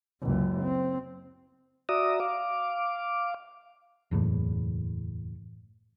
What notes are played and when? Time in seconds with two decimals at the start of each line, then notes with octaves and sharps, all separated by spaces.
0.22 F#1 C#2
0.62 C4
1.89 F#4 D5 E5 A#5 D#6
2.20 F5 D6
4.11 F#1 E2 A2